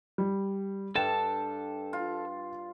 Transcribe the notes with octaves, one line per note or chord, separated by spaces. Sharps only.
G3
G2 A4 G5 A5 E7
F4